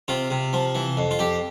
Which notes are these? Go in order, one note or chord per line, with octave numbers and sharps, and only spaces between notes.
C3 F4
C3
F3
E3
F2
F4
F2 G4